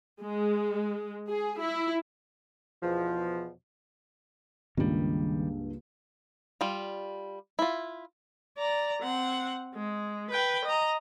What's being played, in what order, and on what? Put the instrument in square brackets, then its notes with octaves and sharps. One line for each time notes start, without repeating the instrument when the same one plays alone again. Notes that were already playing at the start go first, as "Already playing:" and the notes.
[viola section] G#3
G#4
E4
[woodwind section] E2 B2 F3
[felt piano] C#2 G2 A#3 [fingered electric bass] D#3 G3
[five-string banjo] G3 F4
E4 F4
[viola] D5 A#5
C4 F#5
G#3
B4 G5
D#5 A#5